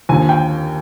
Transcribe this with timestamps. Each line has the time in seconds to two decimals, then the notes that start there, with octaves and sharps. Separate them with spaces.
0.09 D#2 D3 F3 G#5
0.29 G5